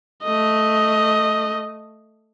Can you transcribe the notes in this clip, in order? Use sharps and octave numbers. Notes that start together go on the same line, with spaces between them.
A3 D#5